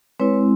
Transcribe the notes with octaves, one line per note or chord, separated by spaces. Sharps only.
G#3 C4 E4 B4 C#5